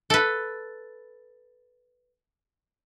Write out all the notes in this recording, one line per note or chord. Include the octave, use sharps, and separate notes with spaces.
A4 B4